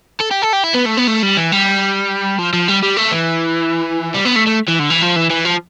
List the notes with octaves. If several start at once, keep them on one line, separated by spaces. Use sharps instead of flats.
A4
G4
A4
G4
E4
B3
A3
B3
A3
G3
E3
G3
F3
F3
G3
G3
A3
E3
G3
B3
A3
A3
E3
D3
E3
F3
E3
E3
F3